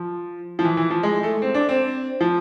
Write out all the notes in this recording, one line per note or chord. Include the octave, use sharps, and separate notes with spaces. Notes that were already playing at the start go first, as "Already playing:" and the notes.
Already playing: F3
F3
E3
E3
F3
G#3
A3
C4
D4
C4
F3